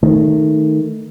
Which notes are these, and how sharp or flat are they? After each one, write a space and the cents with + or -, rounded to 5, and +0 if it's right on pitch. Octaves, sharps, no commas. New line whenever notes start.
D#3 +0 A3 +0